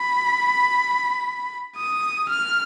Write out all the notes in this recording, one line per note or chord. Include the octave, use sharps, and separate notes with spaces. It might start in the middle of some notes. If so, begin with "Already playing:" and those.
Already playing: B5
D#6
F6